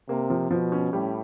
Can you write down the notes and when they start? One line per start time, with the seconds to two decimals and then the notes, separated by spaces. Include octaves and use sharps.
0.09 C3 A#3
0.30 F3
0.51 B2 F3
0.72 C#4
0.93 A2 G3